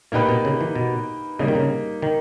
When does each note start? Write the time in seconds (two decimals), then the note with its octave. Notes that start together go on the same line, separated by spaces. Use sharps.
0.12 A#2 A#3 D#4 G4 B4
0.29 B2
0.45 C#3
0.61 E3
0.75 B2
1.39 C#3 G3 A#3 D#4
1.48 D#3
1.55 C#3
2.02 D#3